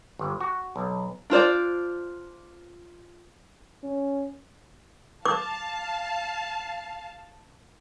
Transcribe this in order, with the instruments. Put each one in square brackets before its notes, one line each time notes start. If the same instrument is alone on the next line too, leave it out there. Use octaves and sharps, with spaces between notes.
[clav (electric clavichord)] G1
F#4
B1
[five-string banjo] D4 F4 C5 D5
[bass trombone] C#4
[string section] F5 A5 [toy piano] D6